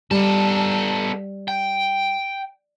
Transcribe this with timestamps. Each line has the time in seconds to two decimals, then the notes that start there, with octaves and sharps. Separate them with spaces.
0.11 G3 B3 A4
1.48 G5